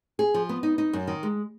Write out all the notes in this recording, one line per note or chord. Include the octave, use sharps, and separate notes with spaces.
G#4
F3
B3
D#4
D#4
F#2
D#3
G#3